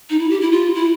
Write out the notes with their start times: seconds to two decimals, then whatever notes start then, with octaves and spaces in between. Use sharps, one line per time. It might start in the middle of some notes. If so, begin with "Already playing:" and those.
0.10 D#4
0.19 E4
0.30 G4
0.41 E4
0.52 F4
0.75 E4